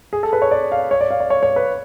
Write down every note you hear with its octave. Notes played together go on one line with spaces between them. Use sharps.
G#4
A4
B4
C#5
D5
F5
C#5
D5
F5
D5
C#5
C#5
B4